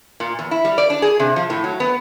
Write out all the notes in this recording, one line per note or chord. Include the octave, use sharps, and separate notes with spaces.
A#2
E2
E4
G3
D5
D4
G#4
C3
F3
A2
F#3
B3